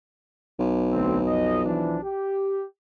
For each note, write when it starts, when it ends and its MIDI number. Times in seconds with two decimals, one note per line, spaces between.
0.59 2.12 35
0.92 1.18 38
0.92 1.18 60
1.28 1.61 41
1.28 1.61 75
1.65 1.98 52
1.65 1.98 53
1.65 1.98 62
2.02 2.64 67